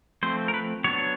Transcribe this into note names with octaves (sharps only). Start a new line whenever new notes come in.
F3 A3 C4 C5
A#4
B4
F#3 B3 D4 C#5